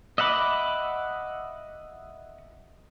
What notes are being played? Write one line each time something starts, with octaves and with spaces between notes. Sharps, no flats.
D#5 E5 F#5 B5 D6